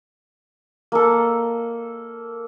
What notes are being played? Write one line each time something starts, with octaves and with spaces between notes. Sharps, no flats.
A#3 A4